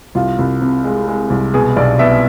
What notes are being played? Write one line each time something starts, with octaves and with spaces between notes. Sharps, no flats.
C2 F4
C2
C3
G#3
G#3
C2
B2 G#4
B1 D5
B2 E5